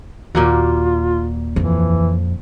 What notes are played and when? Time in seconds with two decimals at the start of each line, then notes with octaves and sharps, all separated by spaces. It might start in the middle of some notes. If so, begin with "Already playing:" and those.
0.35 D#2 A#2 A#3 F4 F#4
1.56 F2 C#3 E3